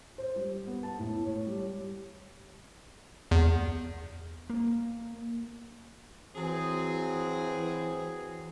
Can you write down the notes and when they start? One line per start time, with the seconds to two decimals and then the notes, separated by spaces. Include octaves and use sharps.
0.18 C5
0.36 G3
0.67 B3
0.83 A5
0.99 A2
1.25 C#5
1.47 G3
3.31 E2
4.50 A#3
6.35 E3 F#3 C4 G#4